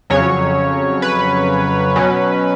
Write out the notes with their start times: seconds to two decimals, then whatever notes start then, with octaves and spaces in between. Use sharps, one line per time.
0.10 F2 C#3 F#3 C#4 C#5
1.02 B4
1.96 B2 F#3 C#4